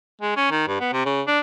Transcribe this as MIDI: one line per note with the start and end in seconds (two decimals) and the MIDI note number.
0.21 0.36 56
0.36 0.47 61
0.51 0.66 51
0.68 0.80 43
0.80 0.93 59
0.93 1.03 48
1.05 1.22 49
1.27 1.40 62